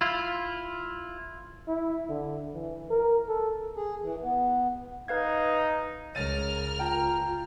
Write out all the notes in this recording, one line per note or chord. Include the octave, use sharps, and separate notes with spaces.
E4 F4
E4
D3
E3
A#4
A4
G#4
E3
B3
D#4 B4 F5 G#6
C#2 A#4 C#5 F6 A6 D#7
F4 G5 A5 A#5